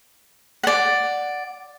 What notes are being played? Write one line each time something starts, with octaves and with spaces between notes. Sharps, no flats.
D5 F#5